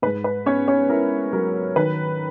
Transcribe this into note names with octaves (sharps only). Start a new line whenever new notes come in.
G#2 B4
B4
B3 C#4 C#5
C#4 C#5
E4 A#4
F#3 A#4
D#3 B4